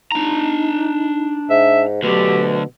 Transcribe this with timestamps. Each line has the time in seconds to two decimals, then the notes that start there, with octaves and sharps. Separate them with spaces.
0.12 D4 D#4 A#5
1.50 G#2 E5
2.03 D2 B2 D3 F#3 G4